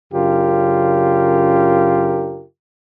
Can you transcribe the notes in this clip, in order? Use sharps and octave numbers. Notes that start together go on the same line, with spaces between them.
F#2 C#3 D4 F4 G4 A#4